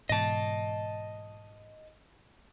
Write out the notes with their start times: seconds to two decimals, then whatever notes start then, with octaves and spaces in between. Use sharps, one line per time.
0.09 G#2 B2 E3 D#5 A5